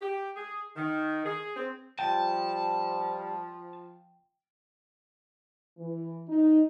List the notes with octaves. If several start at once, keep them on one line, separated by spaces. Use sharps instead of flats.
G4
G#4
D#3
G#4
C4
F3 G3 G5 A5
E3
D#4